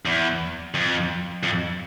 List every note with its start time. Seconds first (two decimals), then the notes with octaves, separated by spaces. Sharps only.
0.05 E2
0.74 F2
1.43 F2